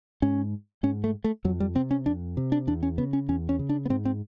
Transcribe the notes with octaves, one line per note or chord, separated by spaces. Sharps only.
G#2 C#4
G#2 C#4
A3
A3
F2 F#3
G3
C3 C4
C#4
F2 D4
C3
D4
E2 D4
C#4
C#3 B3
C#4
E2 C#4
C#4
C#3
D4
B3
G#2 C4
C4